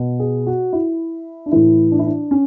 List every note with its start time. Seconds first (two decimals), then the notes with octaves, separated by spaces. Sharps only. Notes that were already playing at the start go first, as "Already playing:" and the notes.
Already playing: B2
0.20 G#4
0.47 F#4
0.73 E4
1.46 D4
1.52 A2 E3 E4
1.92 D4
1.99 E4
2.06 D4
2.31 C#4